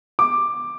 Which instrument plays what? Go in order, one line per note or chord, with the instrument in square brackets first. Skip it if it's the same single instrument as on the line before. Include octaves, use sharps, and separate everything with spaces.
[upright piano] D6